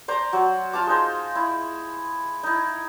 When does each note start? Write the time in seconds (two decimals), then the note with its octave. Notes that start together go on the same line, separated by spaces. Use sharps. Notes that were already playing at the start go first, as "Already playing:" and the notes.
0.08 C5 D5 A#5
0.33 F#3 F#4
0.73 F4 F5 A5 D6
0.87 G#3 D#4 C5
1.35 E4
2.43 D#4 E4